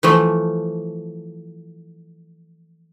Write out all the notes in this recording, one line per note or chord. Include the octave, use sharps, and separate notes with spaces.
E3 F3 A3